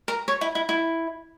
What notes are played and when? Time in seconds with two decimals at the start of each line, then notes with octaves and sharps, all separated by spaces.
0.08 A#4
0.28 C#5
0.41 E4
0.55 E4
0.69 E4